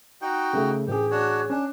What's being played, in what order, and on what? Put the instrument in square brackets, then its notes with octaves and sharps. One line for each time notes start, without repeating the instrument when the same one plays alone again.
[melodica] D#4 F#4 G5
[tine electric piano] C#3 A3
[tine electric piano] A1 G#4 [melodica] G4
[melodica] D4 F#4 C#5
[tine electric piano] C#4 [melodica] D4